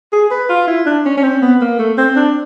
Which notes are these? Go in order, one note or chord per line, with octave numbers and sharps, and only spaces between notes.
G#4
B4
F4
E4
D4
C#4
C#4
C4
B3
A#3
A3
C4
D4